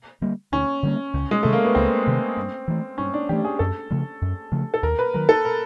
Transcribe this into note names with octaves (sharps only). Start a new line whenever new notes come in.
D3 G3 A#3
D2 C#4
D3 G3 A#3
C#2
G#3
C3 D#3 G3 A3
A#3
B3
C#2 C4
C3 D#3 G3
G2
E3 A3
G2 C#4
D4
E3 A3 G4
G#4
F#2 A4
C#3 F3 A3
F#2
C#3 F3 A3
A4
D#2 A#4
B4
D#3 F#3 A#4
A4
A#4